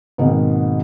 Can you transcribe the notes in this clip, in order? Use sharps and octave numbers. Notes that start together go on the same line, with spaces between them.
G#2 B2 D#3 A#3 C4